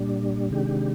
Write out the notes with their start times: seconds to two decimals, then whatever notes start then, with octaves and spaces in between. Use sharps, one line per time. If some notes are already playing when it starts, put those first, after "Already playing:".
Already playing: A#2 G3 D4
0.51 C3 D#3 G#3 D4 G4